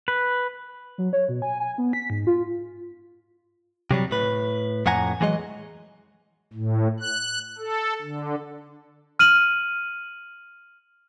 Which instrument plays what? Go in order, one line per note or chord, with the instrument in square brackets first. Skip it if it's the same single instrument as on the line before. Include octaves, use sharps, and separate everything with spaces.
[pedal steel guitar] B4
[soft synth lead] F#3
C#5
B2
G#5
G#5
B3
B6
G#2
F4
[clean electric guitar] C3 F#3 G3
A2 B4
F2 A2 F#5 G#5 A#5
E3 F#3 G#3 D#5
[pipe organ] A2
F#6
A4
D3
[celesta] F6 D#7 F#7